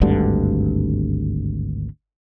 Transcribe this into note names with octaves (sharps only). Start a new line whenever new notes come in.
G#1 D2 G2 D3